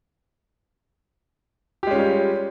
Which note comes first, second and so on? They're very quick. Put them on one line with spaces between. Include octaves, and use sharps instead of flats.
G4 G#3 C#4 F4 G3